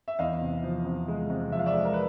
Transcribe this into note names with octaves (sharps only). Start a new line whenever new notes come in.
E5
E2 D#5 F5
C3
F3
C3
G#3
C3
F3 E5
F5
D5 E5
G#3
A#4
B4